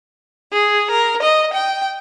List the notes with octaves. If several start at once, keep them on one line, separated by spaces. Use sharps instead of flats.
G#4
A#4
D#5
G5